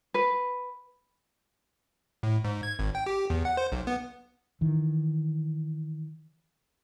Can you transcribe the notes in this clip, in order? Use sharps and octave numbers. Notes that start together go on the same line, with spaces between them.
B4
A2
G#2
G#6
G#1
G5
G4
E2
F#5
C5
B1
B3
D#3 E3